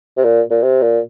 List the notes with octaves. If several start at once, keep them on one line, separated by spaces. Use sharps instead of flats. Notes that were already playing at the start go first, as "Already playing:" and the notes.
C3
A#2
A#2
C3
A#2